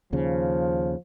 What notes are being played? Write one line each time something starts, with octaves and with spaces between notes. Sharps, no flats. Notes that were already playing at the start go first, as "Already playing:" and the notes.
D#2 C#3 F3